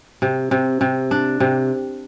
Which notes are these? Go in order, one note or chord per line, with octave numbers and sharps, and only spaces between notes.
C3
C3
C3
D4
C3